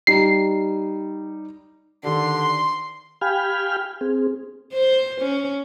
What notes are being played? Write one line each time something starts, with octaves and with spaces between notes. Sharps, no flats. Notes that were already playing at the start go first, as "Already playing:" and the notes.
G3 D#4 C7
D3 D#3 G4 C6
G4 F5 G5 G#5 B5 F6
C4 G#4
C5
C#4